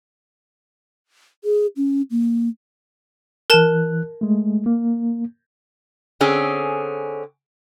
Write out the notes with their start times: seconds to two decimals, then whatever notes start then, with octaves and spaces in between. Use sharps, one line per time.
1.44 G#4
1.76 C#4
2.11 A#3
3.50 E3 A#4 A5 F#6 E7
4.21 G#3 A3
4.66 A#3
6.21 D3 C4 C#4 G#4